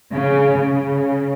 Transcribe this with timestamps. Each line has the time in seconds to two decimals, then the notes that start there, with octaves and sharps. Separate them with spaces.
0.14 C#3
0.60 C#3